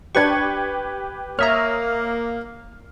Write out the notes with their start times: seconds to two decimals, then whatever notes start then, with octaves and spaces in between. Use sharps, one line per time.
0.15 D4 G4 B4 C#6 G#6
1.39 A#3 C#5 E5 A#5 D#6 F6